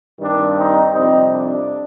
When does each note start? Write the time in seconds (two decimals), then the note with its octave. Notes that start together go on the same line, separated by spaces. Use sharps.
0.20 G2 D#3 G3 C4 D4
0.56 C4 D#4
0.93 F2 C3 G3 C4 D#4
1.29 D4